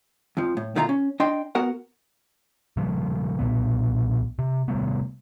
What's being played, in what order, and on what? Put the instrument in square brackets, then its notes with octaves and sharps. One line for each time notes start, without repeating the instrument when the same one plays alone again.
[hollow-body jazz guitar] F2 F3
A2
B2 D#3 A3 F4 E5 A#5
C#4
D4 D#5 G5 C6
B3 F#4 A#4 F#5
[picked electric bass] C#3 F3 G3
B1 F#2 A#2 B3
C3
C3 G3 A3 B3